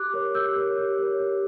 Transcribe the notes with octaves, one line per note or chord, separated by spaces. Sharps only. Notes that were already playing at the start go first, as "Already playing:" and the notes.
Already playing: G4 D6 F#6
A#4 C#5
G4 E6 G6
A#4 C#5
G4
A#4 C#5
G4